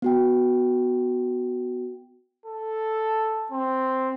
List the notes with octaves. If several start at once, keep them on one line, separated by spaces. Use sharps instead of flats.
B3 F#4 G5
A4
C4